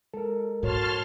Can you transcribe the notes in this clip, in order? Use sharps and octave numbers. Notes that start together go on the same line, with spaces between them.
G#3 A4 A#4
G#2 F3 F#4 C#5 A5 C6 F6